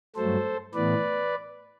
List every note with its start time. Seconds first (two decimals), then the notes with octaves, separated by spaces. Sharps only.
0.16 G2 F#3 A3 A4 C5
0.74 A2 E3 B3 B4 D5